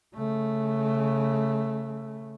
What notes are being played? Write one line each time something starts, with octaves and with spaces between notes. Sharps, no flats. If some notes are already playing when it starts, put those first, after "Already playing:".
C#3 A3